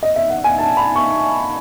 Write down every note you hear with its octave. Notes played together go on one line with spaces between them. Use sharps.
D#5
E5
F#5
G#5
A5
B5
C#6